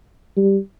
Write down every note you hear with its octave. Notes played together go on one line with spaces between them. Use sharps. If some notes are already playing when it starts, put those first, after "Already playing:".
G3